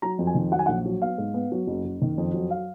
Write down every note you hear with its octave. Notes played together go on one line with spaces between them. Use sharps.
F#3 A#5
F2
G#5
D#3
F#3 F#5
G#5
A#1 F#5
F#3
B3 F5
G#2
B3
F#3
F#1
F#1
D#3
F2
F#3
F5